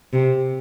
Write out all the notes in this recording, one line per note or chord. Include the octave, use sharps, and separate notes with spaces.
C3